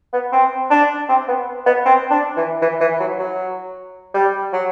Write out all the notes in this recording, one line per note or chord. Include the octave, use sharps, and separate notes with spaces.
B3
C4
D4
C4
B3
B3
C4
D4
E3
E3
E3
F#3
F#3
G3
F#3